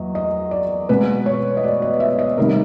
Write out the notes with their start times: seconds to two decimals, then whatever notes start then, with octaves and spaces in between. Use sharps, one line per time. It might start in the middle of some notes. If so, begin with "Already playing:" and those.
Already playing: E2 F#3 A#3 D#5
0.15 D#5
0.51 D5
0.89 B2 G#3 B3 B4
1.26 C#5
1.57 D#5
1.64 D5
1.82 D#5
2.00 E5
2.19 D#5
2.37 C3 D#3 G3 A#4